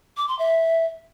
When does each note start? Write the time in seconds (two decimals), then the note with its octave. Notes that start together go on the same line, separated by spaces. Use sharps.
0.17 D6
0.28 C6
0.39 E5